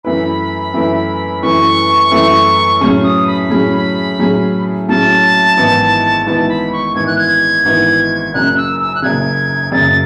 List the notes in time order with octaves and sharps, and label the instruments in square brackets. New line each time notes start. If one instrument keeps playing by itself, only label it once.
[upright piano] F#2 E3 A3 E4 B4 [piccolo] B5
[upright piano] F#2 E3 A3 E4 B4
[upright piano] F#2 E3 A3 E4 B4 [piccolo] C#6
[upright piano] F#2 E3 A3 E4 B4
[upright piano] A2 F#3 C#4 G#4 [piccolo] C#6
[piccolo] D#6
B5
[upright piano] A2 F#3 C#4 G#4
A2 F#3 C#4 G#4
[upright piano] A2 F#3 C#4 G#4 [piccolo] A5
[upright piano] G#1 G#2 E3 B3 E4
[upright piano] G#1 G#2 E3 B3 E4 [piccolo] A5
[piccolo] B5
C#6
[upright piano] G#1 G#2 E3 B3 E4 [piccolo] G#6
[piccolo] F#6
G#6
[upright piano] G#1 G#2 E3 B3 E4
[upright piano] F#1 F#2 C#3 [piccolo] F#6
[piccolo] E6
E6
F#6
[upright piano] F#1 F#2 C#3 [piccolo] G#6
[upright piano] F#1 F#2 C#3 [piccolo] A6